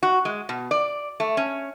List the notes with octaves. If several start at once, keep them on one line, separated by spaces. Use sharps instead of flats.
F#4
G#3
B2
D5
A3
C#4